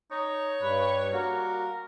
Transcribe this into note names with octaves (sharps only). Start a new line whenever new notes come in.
D#4 C#5
G2 B4
G3 A#3 F#4 A#4